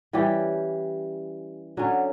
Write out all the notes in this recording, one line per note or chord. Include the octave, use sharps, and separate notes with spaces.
E3 G3 C#4 G4
D3 F#3 C#4